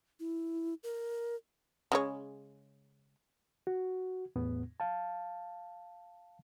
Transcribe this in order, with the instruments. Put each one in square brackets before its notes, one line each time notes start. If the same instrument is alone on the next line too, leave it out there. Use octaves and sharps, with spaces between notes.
[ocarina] E4
A#4
[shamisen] C#3 G#3 C#5
[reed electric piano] F#4
E2 A2 B3
F5 A5